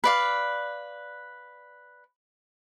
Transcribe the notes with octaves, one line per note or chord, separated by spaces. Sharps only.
B4 D5 F5